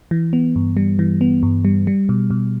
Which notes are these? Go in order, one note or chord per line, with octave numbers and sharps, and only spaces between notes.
E3
B3
G2
G3
E3
B3
G2
G3
G3
B2
B2